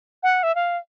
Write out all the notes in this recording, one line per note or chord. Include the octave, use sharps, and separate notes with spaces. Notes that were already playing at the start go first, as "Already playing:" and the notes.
F#5
E5
F5